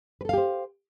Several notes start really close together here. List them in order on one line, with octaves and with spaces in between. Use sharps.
B4 A4 F5 G4 C5